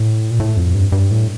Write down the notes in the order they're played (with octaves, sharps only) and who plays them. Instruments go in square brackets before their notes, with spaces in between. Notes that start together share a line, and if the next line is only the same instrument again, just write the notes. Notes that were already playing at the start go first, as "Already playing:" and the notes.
Already playing: [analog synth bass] A2
A#2
A2
F2
G2
G2
A2